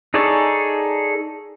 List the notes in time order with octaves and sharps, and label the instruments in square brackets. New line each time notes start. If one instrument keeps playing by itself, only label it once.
[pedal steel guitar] D#4 G#4 A4 C#5 D5